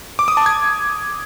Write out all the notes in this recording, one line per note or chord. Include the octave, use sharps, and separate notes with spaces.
D6
D#6
A5
G#6